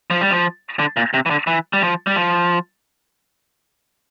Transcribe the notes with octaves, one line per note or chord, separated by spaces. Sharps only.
F3
G3
F3
D3
A#2
C3
E3
D3
E3
G3
F3
G3
F3